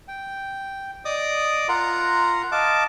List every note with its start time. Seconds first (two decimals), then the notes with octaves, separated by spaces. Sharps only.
0.08 G5
1.05 D5 D#5 D6 D#6
1.69 F4 A#4 F#5 A#5 C6
2.52 D#5 F5 A5 D6